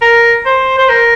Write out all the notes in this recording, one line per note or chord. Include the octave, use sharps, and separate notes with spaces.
A#4
C5
C5
A#4